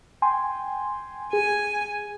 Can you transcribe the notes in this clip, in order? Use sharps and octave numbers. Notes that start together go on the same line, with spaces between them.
G5 G#5 C6
G#4 G#5